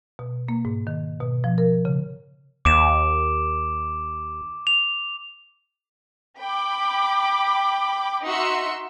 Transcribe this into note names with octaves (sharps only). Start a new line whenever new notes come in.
B2
A#3
G#2
D#3
B2
F3
A#4
C#3
D#2 D6 D7 E7
F7
G5 B5 D6
D#4 F#4 E5 C6 E6 C#7